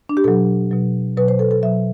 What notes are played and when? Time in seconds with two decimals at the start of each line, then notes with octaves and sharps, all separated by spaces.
0.09 D4
0.17 G4
0.24 B2 F#3 A4
0.71 B2 F#3
1.17 B2 F#3 B4
1.28 C5
1.39 A4
1.51 A4
1.63 B2 F#3 E5